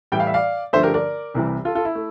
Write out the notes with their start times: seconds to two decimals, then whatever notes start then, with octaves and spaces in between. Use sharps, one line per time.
0.12 A2 E3 G3 G5
0.20 F5
0.27 E5
0.34 D5 F5
0.73 G2 D3 F3 A3 C5 E5
0.83 G4 A#4
0.94 A#4 D5
1.34 C2 C3 E3 G3
1.65 F4 A4
1.75 F4 A4
1.85 E4
1.95 A3